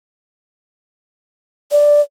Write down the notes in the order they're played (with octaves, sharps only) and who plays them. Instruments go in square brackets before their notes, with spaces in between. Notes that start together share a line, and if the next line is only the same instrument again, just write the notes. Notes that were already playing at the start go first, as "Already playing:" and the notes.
[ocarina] D5